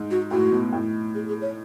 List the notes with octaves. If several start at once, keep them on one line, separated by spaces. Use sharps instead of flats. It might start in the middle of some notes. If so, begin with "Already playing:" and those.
Already playing: G#2
F#4
A2 F#4
B2
A2
G#4
G#4
C#5